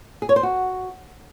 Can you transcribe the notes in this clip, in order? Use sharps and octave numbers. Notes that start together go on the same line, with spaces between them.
G#4
C#5
C5
F#4